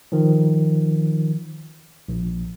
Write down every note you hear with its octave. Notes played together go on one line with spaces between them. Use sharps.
D#3 F3
A#1